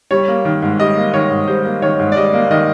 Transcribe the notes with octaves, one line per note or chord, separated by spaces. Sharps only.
G3 C#5
A#3
D#3
G#2
G3 D#5
A#3
D#3 C#5
G#2
G3 C5
A#3
D#3 C#5
G#2
D5
G3 D#5
A#3
D#3 D#5